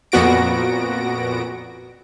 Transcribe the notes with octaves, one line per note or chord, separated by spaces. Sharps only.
F2 A#2 B3 F#4 A#6 D7